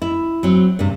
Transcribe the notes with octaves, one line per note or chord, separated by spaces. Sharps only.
E4
F#3 C4
G2 C3